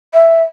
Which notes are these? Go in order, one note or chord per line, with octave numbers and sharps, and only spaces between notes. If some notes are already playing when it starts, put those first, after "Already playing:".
E5